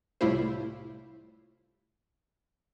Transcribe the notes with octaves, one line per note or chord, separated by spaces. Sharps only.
C2 A2 G3 E4 F4 C5